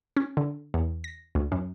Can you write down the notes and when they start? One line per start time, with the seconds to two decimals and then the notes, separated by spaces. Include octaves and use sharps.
0.17 C#4
0.37 D3
0.74 E2
1.04 A#6
1.35 D2
1.52 F#2